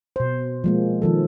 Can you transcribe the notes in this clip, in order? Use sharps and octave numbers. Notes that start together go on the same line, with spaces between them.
B2 C5
F3 G#3 A#3
D#3 F3 A4